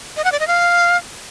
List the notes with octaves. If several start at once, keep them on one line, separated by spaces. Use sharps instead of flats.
D#5
F#5
D5
D#5
F5